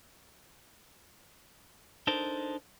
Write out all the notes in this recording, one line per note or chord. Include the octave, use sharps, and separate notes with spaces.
D4 D#4 A4 A#4 C5